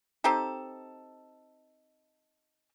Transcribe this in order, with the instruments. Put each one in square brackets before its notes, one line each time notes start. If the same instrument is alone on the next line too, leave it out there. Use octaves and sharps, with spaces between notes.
[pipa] C4 D#4 G4 A4